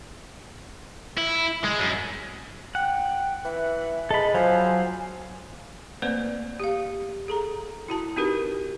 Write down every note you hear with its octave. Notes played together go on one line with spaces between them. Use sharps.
E4
G#3
F#2
F#5 G5
E3 E5
G#3 A4 B5
F3 F#3 C5 G#5
A3 A#3 C4 B4 C5 D5
G4 F5
G#4 A4 A#5
E4 F#4 A5
C4 D#4 F#4 G4 A#4 B4